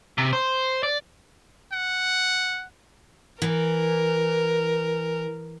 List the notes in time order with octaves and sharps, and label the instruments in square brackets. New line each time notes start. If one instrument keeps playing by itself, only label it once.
[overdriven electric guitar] C3
C5
D5
[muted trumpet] F#5
[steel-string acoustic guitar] E3 [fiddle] A#4